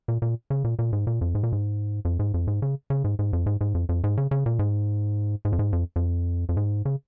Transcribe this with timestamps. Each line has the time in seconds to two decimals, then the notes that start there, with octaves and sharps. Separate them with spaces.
0.08 A#2
0.22 A#2
0.50 C#3
0.64 A#2
0.79 A#2
0.93 G#2
1.07 A#2
1.21 F2
1.35 G#2
1.43 A#2
1.53 G#2
2.05 F2
2.19 G#2
2.34 F2
2.47 G#2
2.62 C#3
2.90 C#3
3.04 G#2
3.19 G#2
3.33 F2
3.46 G#2
3.61 G#2
3.75 F2
3.89 F2
4.04 G#2
4.17 C#3
4.31 C#3
4.46 A#2
4.59 G#2
5.45 G#2
5.53 F2
5.59 G#2
5.73 F2
5.96 F2
6.49 F2
6.57 G#2
6.85 C#3